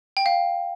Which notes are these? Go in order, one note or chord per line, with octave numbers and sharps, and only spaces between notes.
G5
F5